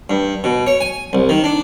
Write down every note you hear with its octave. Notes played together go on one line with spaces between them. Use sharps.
G2
B2
C#5
G#5
C2
D#3
D4